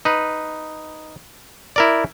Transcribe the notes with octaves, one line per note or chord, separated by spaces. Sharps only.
D#4 B4
E4 A#4 D5